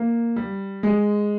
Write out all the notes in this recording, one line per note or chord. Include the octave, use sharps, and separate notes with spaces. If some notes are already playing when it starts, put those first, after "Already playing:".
Already playing: A#3
G3
G#3